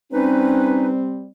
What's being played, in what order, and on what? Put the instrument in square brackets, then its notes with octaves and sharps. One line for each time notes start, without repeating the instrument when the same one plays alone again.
[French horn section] G3 C4 [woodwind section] C#4 D#4 B4